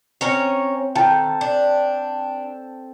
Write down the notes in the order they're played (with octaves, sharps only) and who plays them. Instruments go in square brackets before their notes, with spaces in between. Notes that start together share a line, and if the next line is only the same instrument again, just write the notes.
[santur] C4 [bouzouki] C#4 A#4 C#5
[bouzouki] D#3 [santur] A4 G5 A5
[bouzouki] D4